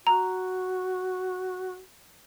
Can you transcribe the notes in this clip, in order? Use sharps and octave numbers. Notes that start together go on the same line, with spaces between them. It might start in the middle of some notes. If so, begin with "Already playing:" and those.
F#4 A#5